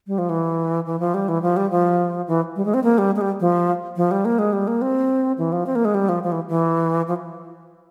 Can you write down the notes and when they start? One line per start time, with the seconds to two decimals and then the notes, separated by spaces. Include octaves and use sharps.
0.07 G3
0.18 F3
0.29 E3
0.86 E3
1.00 F3
1.14 G3
1.29 E3
1.42 F3
1.57 G3
1.71 F3
2.28 E3
2.56 G3
2.65 G#3
2.74 C4
2.84 A#3
2.98 G3
3.16 G#3
3.21 G3
3.40 F3
3.97 F3
4.11 G3
4.25 A#3
4.39 G#3
4.53 G3
4.68 A#3
4.82 C4
5.38 E3
5.53 F3
5.66 C4
5.75 A#3
5.85 G#3
5.95 G3
6.09 F3
6.23 F3
6.32 E3
6.49 E3
7.08 F3